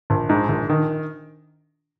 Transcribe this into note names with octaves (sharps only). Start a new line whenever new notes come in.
A#1
G#2
A#1
D#3